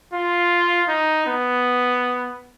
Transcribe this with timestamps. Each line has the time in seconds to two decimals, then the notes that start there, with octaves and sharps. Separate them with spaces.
0.13 F4
0.88 D#4
1.26 B3